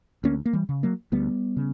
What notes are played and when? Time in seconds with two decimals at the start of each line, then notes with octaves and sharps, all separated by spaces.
0.24 D2 A#3 C#4
0.45 A#3
0.53 E3 G3
0.69 C#3
0.83 F#3 A#3
1.12 D2 G3 B3
1.56 C#3